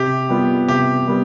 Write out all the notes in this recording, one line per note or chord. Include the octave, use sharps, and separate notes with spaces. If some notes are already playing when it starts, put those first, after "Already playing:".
Already playing: C3 G4
G3 B3 F4
C3 G4
G3 B3